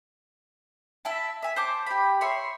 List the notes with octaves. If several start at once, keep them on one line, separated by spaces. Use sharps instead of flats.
E4 E5 A5
E5 G#5
C5 A5 D6
G4 B5
C#5 E5 B5 C6